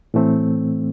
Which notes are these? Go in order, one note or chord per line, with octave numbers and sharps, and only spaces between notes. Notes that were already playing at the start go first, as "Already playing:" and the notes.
A2 E3 A3 C4